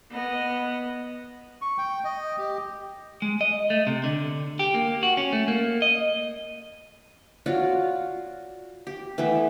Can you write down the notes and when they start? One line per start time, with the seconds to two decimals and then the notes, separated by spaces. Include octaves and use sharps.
0.11 B3 D#5
1.62 C#6
1.78 G5
2.04 D#5
2.38 G4
3.22 G#3
3.41 D#5
3.70 A3
3.87 C3
4.04 D3
4.59 G4
4.74 A#3
5.03 F#4
5.17 C#4
5.33 A3
5.48 A#3
5.82 D#5
7.46 F4 F#4 C#5 D5
8.87 G4
9.18 E3 A3 B3 E4